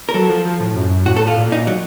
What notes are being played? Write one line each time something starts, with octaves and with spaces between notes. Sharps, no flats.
A#4
F#3 A4
F3
F3
A2
F#2
A2 F#4
A4
F4
A#2
D#4
F#3